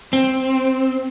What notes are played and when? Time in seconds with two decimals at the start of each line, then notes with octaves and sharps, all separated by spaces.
0.13 C4